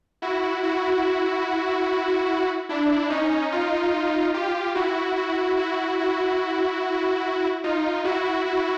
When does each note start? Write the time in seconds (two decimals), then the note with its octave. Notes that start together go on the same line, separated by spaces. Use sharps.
0.22 E4 F#4
0.63 E4 F#4
2.69 D4 E4
3.10 C#4 D#4
3.52 D#4 F4
4.34 F4 G4
4.75 E4 F#4
5.16 E4 F#4
5.57 E4 F#4
5.98 E4 F#4
7.64 D#4 F4
8.04 E4 F#4
8.45 E4 F#4